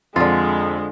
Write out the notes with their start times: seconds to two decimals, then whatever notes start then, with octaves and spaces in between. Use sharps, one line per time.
0.16 F2 D3 G#3 F4